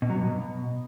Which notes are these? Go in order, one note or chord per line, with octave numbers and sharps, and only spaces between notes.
B2
F#3
G2
B2